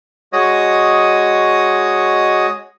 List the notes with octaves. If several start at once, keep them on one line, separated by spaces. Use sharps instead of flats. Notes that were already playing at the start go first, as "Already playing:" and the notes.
G#3 F#4 C#5 D#5 D#6